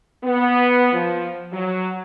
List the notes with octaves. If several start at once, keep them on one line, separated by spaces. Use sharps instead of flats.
B3
F3
F#3